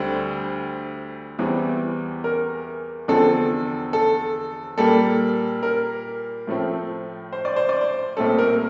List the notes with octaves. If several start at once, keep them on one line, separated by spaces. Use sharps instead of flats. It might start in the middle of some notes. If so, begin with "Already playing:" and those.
Already playing: D2 D3 G3 C4 C5
E2 E3 G3 C4
A#4
E2 D3 F3 C4 A4
A4
A#2 G3 A#3 A4
A#4
A2 F3 A3 C4
C5
D5
C5
D5
C5
C2 A#2 A3 C4 A4
A#4